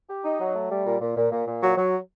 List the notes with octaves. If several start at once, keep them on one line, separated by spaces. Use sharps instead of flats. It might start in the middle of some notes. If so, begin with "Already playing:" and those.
G4
D#4
F#3
A3
G3
A#2
A#2
A#2
A#2
A#2
F#3
F#3